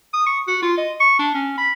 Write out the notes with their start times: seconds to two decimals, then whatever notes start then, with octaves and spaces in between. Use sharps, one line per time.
0.14 D#6
0.27 C#6
0.48 F#4
0.63 F4
0.78 D#5
1.00 C#6
1.19 D4
1.35 C#4
1.58 B5